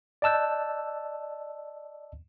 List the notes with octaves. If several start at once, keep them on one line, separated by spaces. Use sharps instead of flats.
D5 D#5 A5 E6 F#6 G6